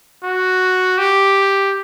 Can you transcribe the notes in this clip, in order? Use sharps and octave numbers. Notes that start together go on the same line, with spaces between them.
F#4
G4